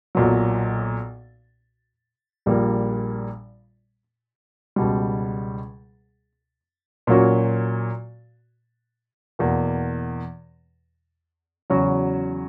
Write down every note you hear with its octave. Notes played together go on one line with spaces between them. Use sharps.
B1 A#2 F#3
A#1 A#2 G3 A#3
C#2 B2 G3
A#2 F#3 A#3 C#4 F#4
E2 B2 A#3
E2 C#3 F#3 C#4 F#4